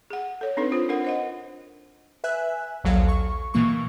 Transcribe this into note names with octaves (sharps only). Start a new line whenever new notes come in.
G#4 F#5
A4 C#5
C4 D4 D#4 A4 B4
D4 F4 C5
D4 A#4 F#5
C5 D#5 F#5
B4 E5 G#5 F#6
A#1 D#2 F#3 A4 F5
C#6
B2 E3 A#3 C#6